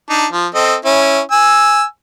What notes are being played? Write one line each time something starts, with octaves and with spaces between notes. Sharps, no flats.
D4 D#4
F3
C4 A4 D#5
C#4 E4
G#5 E6